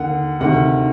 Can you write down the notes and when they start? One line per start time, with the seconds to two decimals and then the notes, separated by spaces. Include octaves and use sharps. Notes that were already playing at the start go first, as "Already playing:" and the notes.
Already playing: D#2 D3 F#5
0.40 D2 C3 D#3 F#5